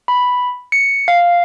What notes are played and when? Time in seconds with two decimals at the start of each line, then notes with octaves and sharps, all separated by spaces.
0.08 B5
0.72 C#7
1.08 F5